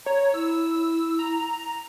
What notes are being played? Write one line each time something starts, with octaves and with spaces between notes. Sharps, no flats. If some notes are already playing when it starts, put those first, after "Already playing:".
C#5 A#5
E4 E6
A#5